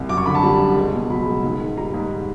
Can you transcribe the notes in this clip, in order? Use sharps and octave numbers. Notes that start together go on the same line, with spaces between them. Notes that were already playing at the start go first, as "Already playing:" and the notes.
Already playing: C2
F#2 D6
C#6
D3 B5
A5
G3
F#2
C#2
B2
F#3 B5
C#2
G#2
D#3
G3 A#5
G#2